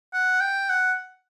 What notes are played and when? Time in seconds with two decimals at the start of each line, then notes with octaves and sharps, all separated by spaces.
0.13 F#5
0.40 G5
0.69 F#5